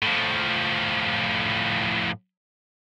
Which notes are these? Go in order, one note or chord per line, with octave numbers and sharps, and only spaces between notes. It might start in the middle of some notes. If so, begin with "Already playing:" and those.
A2 F3